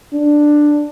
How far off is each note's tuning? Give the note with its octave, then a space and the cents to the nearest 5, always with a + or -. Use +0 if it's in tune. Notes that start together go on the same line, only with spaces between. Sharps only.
D4 +10